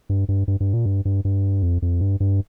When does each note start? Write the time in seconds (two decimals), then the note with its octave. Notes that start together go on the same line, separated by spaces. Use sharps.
0.09 G2
0.29 G2
0.48 G2
0.60 G2
0.74 A#2
0.86 G2
1.05 G2
1.25 G2
1.63 F2
1.82 F2
2.01 G2
2.20 G2